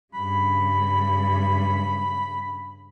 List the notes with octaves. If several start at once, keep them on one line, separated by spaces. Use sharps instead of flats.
G2 C#3 B5